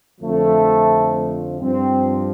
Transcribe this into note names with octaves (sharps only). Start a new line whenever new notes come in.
F2 D3 F3 A3
G2 F3 C4